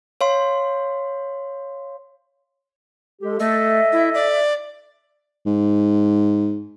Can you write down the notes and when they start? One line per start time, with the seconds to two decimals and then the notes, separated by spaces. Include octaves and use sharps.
0.21 C#5 F5 C6
3.22 G#3 G4 A4
3.40 A3 A4 D#5 E5
3.92 E4
4.14 D5
5.46 G#2